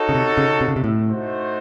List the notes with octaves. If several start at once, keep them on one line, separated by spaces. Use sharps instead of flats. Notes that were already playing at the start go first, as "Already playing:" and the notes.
Already playing: D#4 F#4 A4 C#5
C#3
C3
C#3
C3
C#3
C3
A2
A3 D#4 F#4 C5